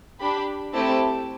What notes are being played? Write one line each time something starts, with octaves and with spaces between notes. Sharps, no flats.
D4 G4 B5
A3 C4 E4 G4 A5